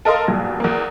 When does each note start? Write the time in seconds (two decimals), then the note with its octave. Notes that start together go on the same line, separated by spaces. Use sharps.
0.05 A4 A#4 D#5 F5 C6
0.28 B1 E2 G2 A#2
0.60 E2 A#3